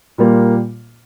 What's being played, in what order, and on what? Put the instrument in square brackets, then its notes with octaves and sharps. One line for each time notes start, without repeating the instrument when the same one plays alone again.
[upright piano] A#2 G3 A#3 F4